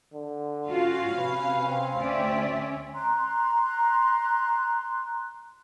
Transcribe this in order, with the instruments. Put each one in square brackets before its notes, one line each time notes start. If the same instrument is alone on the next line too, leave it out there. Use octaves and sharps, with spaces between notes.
[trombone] D3
[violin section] C#4 F5 [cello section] F4 F#4
[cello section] C3 [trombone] B4
[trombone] C4
[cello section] D2 D5 E5 [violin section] C#4
[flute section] A#5 C6 F#6